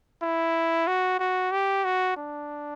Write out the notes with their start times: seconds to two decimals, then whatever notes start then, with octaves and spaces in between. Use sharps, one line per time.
0.22 E4
0.87 F#4
1.19 F#4
1.52 G4
1.85 F#4
2.17 D4